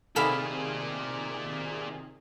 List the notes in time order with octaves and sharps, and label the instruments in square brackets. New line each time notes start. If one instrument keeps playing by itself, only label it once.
[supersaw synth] C3 D#3 G#4 [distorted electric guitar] F4 D5 [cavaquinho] A4 F5 B5